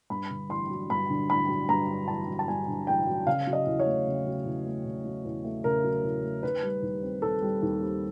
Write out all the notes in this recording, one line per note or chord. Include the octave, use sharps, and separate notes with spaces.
G2 B5
D3
A1 C6
F#3
G2 B5
D3
A1 B5
F#3
G2 A#5
D3
A1 A5
F#3
A5
G2 G#5
D3
A1 G5
F#3
C#3 F5
F#3
D#5
E2
C#5
A3
C#3
F#3
E2
A3
C#3
F#3
E2
A3
C#3 A#4
F#3
E2
A3
D#3 B4
G3
D#2
C4
D#3 A4
G3
D#2
C4